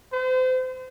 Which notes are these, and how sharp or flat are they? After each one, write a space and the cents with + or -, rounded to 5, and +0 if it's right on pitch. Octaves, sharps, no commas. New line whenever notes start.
C5 -35